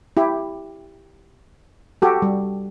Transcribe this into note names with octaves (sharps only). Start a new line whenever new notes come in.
E4 G4
F#4 G4 A4
G3